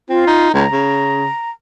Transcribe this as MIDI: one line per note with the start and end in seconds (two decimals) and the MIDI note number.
0.09 0.24 60
0.09 0.52 65
0.27 0.53 63
0.54 0.65 37
0.54 1.50 82
0.72 1.28 49